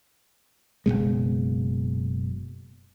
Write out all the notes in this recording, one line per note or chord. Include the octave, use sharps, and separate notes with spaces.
F#1 C#2 B2 G#3